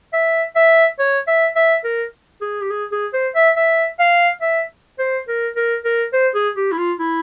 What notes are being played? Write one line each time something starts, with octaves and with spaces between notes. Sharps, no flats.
E5
E5
C#5
E5
E5
A#4
G#4
G4
G#4
G#4
C5
E5
E5
F5
E5
C5
A#4
A#4
A#4
C5
G#4
G4
E4
F4
E4